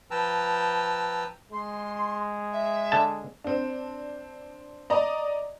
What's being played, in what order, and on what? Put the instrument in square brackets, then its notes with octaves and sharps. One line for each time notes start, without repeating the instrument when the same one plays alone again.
[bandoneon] F3 B4 G5 A5 A#5 E6
[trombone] G#3 [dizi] C6
[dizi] E5
[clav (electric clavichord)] D3 A5
[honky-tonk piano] C4 D4
D5 D#5 A#5